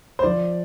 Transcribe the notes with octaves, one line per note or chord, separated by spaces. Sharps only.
C5
F3 D5